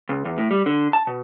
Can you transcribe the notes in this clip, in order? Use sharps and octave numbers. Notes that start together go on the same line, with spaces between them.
C#2
E2
A2
G3
D3
A5
B2